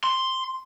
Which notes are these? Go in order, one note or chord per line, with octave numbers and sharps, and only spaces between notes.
C6